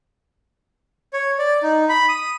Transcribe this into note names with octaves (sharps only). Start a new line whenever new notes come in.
C#5
D5
D#4
B5
D#6